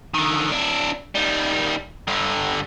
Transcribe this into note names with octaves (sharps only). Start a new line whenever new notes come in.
D3 D#3
D4 E4
D#3 G3
G2 D3